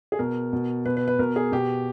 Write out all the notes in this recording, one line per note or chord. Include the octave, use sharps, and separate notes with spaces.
G#4
B2 A#4
B2
B2 B4
B4
B4
B2 A#4
G#4
B2 G4